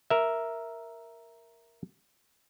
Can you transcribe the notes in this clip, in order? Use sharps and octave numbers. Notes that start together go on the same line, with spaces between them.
A#4 E5